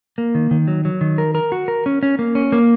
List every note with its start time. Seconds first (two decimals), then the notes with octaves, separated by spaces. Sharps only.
0.18 A#3
0.35 D#3
0.51 D#3
0.68 F#3
0.85 F#3
1.01 D#3
1.18 A#4
1.35 A#4
1.52 F#4
1.68 A#4
1.86 C#4
2.03 C#4
2.19 A#3
2.35 C#4
2.52 A#3